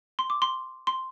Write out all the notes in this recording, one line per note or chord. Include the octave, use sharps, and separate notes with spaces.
C6
D6
C6
C6